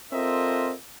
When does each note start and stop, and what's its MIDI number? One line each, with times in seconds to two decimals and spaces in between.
0.13 0.74 60
0.13 0.74 65
0.13 0.74 69
0.13 0.74 70
0.13 0.74 75
0.13 0.74 76